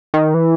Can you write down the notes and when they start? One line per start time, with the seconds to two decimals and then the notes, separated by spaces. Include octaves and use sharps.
0.14 D#3
0.34 E3